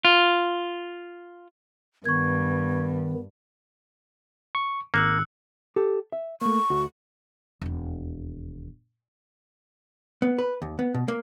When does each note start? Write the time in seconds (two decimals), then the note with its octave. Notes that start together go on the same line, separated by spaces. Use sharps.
0.05 F4
2.05 G2 D#3 B3 C#6 G#6
4.55 C#6
4.94 G#1 A#3 E6 F#6 C#7
5.76 G4 A4
6.12 E5
6.41 A3 A#3 C#6
6.70 D2 F#4
7.62 E1 D#2
10.22 B3
10.38 B4
10.62 D#2
10.79 B3
10.94 B2
11.08 A#3